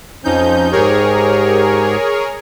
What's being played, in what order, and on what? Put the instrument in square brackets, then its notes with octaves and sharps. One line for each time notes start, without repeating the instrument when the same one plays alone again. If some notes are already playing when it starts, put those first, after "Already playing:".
[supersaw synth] F2 D#4 G6 [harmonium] F3 C#4
[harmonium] G#2 G4 [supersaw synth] G#4 A#4 C#5